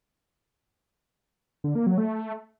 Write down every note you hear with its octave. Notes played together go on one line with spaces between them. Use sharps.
D3
A#3
F#3
A3